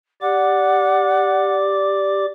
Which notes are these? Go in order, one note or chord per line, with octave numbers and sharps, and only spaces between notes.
G4 D5 F#5 D6